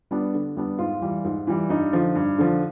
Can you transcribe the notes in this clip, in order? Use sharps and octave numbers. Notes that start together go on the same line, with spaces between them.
G3 B3 D4
D3
G3 B3 D4
G#2 F4
E3 G3
G#2
E3 G3
G2 D#4
D3 F3
G2
D3 F3